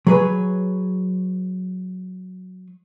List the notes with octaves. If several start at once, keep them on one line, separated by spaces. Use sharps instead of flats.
F#3 G#4 B4 C#5